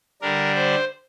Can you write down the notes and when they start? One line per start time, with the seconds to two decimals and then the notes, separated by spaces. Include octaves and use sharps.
0.22 D3 G3 D4 A#4
0.56 C5